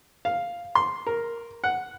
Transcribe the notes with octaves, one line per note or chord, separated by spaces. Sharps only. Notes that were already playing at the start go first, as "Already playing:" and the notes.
F5
C6
A#4
F#5